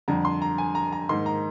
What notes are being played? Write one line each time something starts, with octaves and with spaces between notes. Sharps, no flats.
F2 D3 G3 A#5
C6
A#5
G#5
A#5
A#5
G#2 D#3 A#3 D#4 C6
A#5